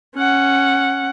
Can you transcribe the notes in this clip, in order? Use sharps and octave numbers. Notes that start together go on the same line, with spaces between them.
C#4 F#5